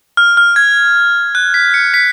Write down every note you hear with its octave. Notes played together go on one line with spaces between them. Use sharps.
F6
F6
G#6
F#6
B6
C#7
B6